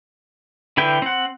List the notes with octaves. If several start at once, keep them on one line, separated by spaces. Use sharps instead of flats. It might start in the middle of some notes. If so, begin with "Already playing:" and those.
D3 E4 B4 G5
C4 F#5